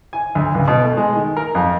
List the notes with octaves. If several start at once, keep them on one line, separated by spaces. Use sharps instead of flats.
G#5
D2
C#2
B2
A3
G#3
D#3
A#4
F2